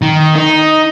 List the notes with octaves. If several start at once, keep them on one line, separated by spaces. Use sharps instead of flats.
D#3
D#4